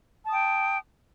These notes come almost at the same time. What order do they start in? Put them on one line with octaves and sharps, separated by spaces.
A5 D#6 G5